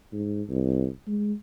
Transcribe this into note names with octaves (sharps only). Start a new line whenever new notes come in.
G#2
C2
G#3